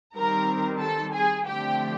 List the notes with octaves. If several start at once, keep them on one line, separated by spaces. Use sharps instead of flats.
D#3 G3 C4 A#4 A#5
A4 A5
G#4 G#5
D3 F3 A3 C4 G4 G5